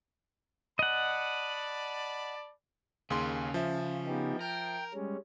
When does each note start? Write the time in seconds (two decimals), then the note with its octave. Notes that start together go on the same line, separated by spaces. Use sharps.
0.79 D5 D#5 F#5 A5 B5
3.10 D#2 C#3 G#4 C6
3.54 F3 E5
4.07 B3 D#4 G4
4.41 A#4 G5
4.94 G3 G#3 C#4